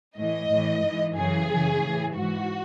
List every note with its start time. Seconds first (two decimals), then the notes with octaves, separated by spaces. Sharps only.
0.16 A2 E3 D#5
0.49 A2 E3
0.83 G#2 E3
1.16 F#2 C#3 E3 G#4
1.49 F#2 C#3 E3
1.82 A2 E3
2.15 G#2 E3 F#4